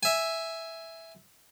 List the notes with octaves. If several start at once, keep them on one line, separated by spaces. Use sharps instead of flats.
E5 G#5